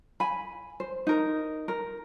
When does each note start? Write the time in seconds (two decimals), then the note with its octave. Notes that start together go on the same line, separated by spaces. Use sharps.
0.20 G#5 B5
0.80 C5
1.07 D#4 A#4
1.68 A#4